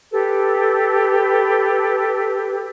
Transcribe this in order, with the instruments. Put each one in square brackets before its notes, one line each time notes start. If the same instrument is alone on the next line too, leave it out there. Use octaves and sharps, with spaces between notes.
[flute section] G4 A4 B4